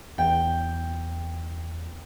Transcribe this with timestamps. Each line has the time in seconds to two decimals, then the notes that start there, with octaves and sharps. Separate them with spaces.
0.18 E2 G5